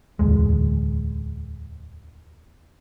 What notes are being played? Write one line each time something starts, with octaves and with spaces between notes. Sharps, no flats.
D1 G#1 E2 G#3